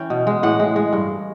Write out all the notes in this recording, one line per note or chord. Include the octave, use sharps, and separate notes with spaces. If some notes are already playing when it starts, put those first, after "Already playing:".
Already playing: E3 C#4 G5
B2
G#3
A2 F#5
G#3
G#3
G2